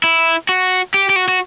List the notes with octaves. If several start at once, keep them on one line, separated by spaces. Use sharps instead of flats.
E4
F#4
G4
G4
F#4
F#4